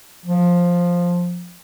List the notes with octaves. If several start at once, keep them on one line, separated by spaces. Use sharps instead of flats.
F3